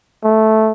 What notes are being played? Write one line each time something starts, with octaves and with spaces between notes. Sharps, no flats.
A3